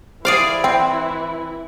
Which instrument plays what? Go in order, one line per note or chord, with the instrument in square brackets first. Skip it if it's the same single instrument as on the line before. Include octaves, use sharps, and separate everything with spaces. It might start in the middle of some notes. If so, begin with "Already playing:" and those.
[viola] E3 E4 [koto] G#4 D5 F5 [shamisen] C5
[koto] C4 [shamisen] G5